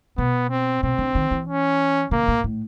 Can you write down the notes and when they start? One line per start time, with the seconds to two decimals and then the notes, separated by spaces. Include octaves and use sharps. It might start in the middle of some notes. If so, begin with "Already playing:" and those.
0.17 B2 B3
0.50 C4
0.82 B2 C4
0.98 D3
1.15 D#3
1.31 E3
1.47 C#4
2.11 C#3 A#3
2.28 A#2
2.44 A2